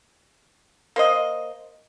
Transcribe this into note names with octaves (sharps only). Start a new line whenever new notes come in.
A#3 C5 D#5